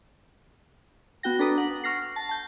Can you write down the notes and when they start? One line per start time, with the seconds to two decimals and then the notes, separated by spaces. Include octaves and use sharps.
1.23 B3 F#4 G5 A#6
1.39 D4 A4 B4 A#5 D6 D#6
1.58 F#5
1.84 C#6 F6 A#6 C7
2.16 A5
2.29 A5 G6